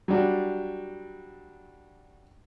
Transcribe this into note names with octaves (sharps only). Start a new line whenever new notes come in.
F#3 G3 D4